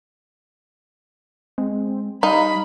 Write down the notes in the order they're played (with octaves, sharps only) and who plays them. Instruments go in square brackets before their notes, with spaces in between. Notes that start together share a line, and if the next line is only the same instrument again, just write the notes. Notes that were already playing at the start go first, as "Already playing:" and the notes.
[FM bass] G#3 [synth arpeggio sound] C4
[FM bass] G3 [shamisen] D#4 [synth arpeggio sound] F5 [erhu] B5